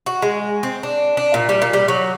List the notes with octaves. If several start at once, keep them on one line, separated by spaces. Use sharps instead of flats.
F#4
G#3
C4
D4
D4
A#2
G3
A#2
G3
F#3